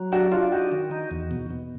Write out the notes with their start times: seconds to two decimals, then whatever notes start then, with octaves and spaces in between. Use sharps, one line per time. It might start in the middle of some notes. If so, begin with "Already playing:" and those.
Already playing: F#3
0.12 D4 F#4
0.32 D4 F4
0.52 D#4 F#4
0.72 D#3
0.91 D#4
1.11 E2
1.31 B2
1.50 B2